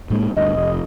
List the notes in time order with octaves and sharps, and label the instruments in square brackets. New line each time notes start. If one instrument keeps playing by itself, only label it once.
[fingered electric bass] A2 G#3 A#3
[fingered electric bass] D2 G2 [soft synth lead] D#5
[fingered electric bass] F1